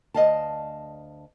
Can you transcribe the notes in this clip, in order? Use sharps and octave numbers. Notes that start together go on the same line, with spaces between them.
D2 D#5 F5 A5